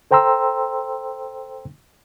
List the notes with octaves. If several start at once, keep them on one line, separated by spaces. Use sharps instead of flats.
A4 C5 G5 A#5 C6 E6